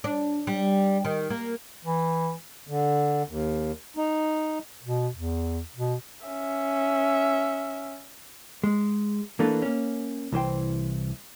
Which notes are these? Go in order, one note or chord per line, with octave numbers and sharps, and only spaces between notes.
D4
G3
D#3
A#3
E3
D3
D#2
D#4
B2
E2
B2
C#4 E5
G#3
E3 A3 A#3 D4 A4 B4
A#3 C#4
C2 E3 C5 G5